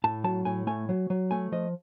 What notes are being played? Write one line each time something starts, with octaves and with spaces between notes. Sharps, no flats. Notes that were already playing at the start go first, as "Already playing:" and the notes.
A2 A5
F#3 A5
A2 G#5
A3 G#5
F#3
F#3
A3 G#5
F3 D#5